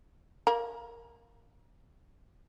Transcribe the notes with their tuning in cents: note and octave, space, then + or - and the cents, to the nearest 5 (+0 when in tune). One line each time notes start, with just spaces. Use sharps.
A#3 +0 A#4 +0 A#5 +35